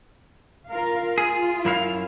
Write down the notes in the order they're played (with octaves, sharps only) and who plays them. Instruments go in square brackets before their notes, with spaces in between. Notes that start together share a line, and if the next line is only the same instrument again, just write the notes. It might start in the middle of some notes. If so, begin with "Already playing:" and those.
[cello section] F4 A#4 F5
[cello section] F4 [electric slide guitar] G#4
[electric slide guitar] F#2 E4 F5